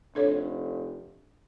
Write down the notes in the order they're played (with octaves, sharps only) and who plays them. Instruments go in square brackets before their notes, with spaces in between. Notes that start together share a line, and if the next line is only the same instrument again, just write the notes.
[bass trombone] F1 [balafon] D4 A4 C#5